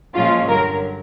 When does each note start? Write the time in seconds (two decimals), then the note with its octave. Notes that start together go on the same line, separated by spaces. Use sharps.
0.15 A#2 F3 G#3 C#4 F4
0.48 G2 D3 F#3 A#4